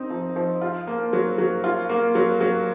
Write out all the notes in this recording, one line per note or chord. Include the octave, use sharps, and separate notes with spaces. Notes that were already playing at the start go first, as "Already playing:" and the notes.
Already playing: C4 D#4
F3
F3
F4
A#3
F#3
F#3
F4
A#3
F#3
F#3